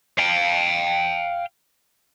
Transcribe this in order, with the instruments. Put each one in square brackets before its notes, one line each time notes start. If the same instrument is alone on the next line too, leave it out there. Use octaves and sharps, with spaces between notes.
[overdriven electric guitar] F5 G5